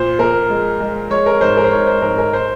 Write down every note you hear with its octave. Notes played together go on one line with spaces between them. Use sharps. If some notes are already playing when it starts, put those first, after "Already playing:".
Already playing: A#2 C5
A#2 A#4
G#3
G#3
G#3 C#5
A#4
G#2 C5
A#4
C5
G#2 C#5
C5
G#2 A#4
A#4
C5